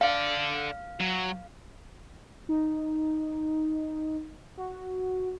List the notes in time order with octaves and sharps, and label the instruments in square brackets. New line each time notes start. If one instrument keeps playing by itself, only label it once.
[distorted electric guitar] A4 D5 [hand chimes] F5
[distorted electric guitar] F#3
[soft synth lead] D#4
F#4